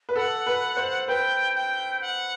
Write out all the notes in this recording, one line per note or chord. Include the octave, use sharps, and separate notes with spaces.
B4
A4 F#5
B4
C5
B4 G5
G5
F#5